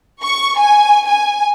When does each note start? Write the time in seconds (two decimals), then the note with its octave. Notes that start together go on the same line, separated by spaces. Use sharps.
0.22 C#6
0.58 G#5
1.08 G#5